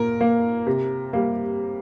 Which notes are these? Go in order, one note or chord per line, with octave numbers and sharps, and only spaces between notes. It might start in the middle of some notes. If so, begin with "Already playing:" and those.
Already playing: A#2 A#4
A#3
C3
G3 A#3